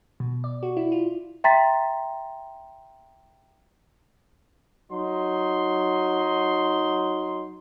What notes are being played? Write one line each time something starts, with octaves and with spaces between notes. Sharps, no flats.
B2
D5
F#4
E4
F4
E5 G5 A#5 C6 A6 B6
F#3 D#4 C6